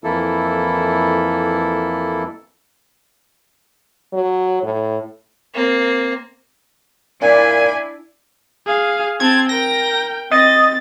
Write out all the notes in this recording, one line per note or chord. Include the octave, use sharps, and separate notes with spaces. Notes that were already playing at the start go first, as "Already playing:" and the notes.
F2 E3 A#3 E4 A4
F#3
A2
A#3 C4
A#2 D4 E4 D5 G#5
G#4 F5
C4 A5 G#6
A#4 G5 A#6
C4 D#5 A6